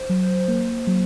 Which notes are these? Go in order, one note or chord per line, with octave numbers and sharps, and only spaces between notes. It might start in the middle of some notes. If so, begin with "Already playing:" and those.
Already playing: C5
F#3
A#3
F#3